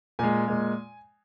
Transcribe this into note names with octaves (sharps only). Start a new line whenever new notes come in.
A#2 G#3 G#5
A#2 G#3